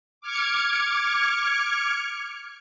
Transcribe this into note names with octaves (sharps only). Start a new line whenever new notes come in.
D6 F6 G#6 C#7